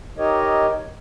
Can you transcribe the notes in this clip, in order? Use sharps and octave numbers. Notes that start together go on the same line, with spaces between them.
D#4 G4 A#4 C#5 D#5